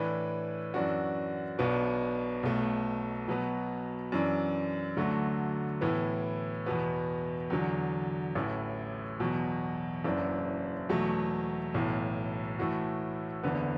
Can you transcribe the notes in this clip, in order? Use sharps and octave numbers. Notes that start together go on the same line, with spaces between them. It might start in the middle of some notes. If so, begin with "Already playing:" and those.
Already playing: A2 E3 D4 B4
F#2 E3 D4 F#4
B1 B2 B3 D4
B1 B2 A3
B2 F#3 B3
F#2 E3 D4
D2 D3 F#3 A3 F#4
A2 E3 B3
E2 B2 B3
E2 D3 F#3
A1 A2 E3
E2 B2 F#3
F#1 F#2 E3 D4
E2 B2 F#3 A3
B1 A2 E3
A2 E3 A3 F#4
F#1 E2 D3 B3